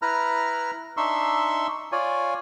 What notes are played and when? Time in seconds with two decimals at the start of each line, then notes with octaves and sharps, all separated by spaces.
0.02 E4 B4 A#5 F6
0.97 D4 D#4 E5 C6 C#6 E6
1.92 F4 C#5 D5 G#5